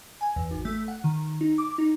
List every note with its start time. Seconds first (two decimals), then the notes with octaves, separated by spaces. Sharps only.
0.21 G#5
0.36 E2
0.51 G#1
0.65 A3
0.88 F#5
1.04 D#3
1.41 D#4
1.58 D6
1.78 D#4